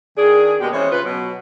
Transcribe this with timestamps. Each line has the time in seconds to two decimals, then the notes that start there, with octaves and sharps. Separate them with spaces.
0.17 D#3 D4 G#4
0.60 B2 G#3 A#3 B3 G4
0.73 E3 G#3 C#4 C5 C#5
0.91 C#3 F4 B4
1.05 B2 F#3